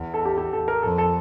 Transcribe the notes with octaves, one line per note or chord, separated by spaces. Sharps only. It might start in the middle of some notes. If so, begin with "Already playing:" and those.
Already playing: E2
A4
G4
G4
A4
A#4
F2 A4
A4